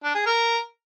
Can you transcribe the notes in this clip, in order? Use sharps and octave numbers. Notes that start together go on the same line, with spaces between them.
D4
G#4
A#4